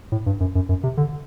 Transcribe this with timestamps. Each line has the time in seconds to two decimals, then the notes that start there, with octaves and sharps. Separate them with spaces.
0.12 A2
0.26 G2
0.40 F#2
0.55 F#2
0.69 F#2
0.83 C3
0.97 D3